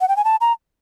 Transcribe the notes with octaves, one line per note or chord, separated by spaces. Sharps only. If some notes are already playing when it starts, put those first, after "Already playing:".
F#5
G5
G#5
A5
A#5